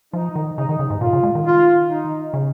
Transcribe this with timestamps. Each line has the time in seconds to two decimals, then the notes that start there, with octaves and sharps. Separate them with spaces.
0.13 F3 D#4
0.35 D#3
0.57 C#3 D#4
0.69 D#3
0.79 C#3
0.90 G#2
1.01 A#2 F4
1.13 C#3
1.23 G#3
1.35 D#3
1.45 F4
1.90 D#4
2.34 C#3